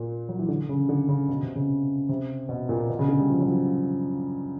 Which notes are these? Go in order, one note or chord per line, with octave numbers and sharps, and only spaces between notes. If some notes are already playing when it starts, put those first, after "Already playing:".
Already playing: A#2
F#3
E3
D3
C#3
D3
C#3
B2
C3
C#3
C3
B2
A#2
B2
C#3
D3
G3
F3
F#3
F3